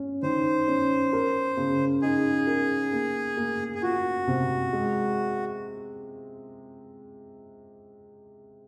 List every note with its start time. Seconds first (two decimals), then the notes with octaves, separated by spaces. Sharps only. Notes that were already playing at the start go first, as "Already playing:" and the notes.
Already playing: C#4
0.23 D#3 C5
0.68 C#4
1.13 A#4
1.57 C#3
2.02 D#4 G#4
2.47 A#4
2.92 A#3
3.37 A#3
3.75 G#4
3.82 F4 F#4
4.27 C3
4.73 G#3